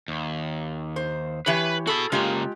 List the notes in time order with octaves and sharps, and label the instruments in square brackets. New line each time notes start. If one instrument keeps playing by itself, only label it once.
[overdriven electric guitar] D#2
[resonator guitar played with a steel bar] C5
[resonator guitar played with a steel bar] E3 G4 C#5 [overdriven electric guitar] B4
[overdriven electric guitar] F#4 B5 [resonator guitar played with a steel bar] G#4 A4
[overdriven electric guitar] C#3 A#3 [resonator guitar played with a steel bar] G#3 F4 G4